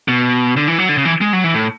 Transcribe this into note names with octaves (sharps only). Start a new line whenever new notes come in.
B2
D3
E3
F#3
D3
C#3
E3
G#3
F#3
E3
A2